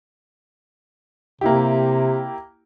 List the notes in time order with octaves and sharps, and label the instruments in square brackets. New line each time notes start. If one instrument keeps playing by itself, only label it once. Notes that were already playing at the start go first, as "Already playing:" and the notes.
[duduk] C3 [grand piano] A#3 E4 G4